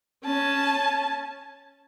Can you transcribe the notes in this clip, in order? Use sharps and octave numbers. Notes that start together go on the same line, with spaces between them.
C#4 A5